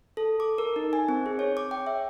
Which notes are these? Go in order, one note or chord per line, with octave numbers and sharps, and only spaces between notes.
A4
D6
A#4
D#4
G#5
C4
G#4
C#5
D6
G5
E5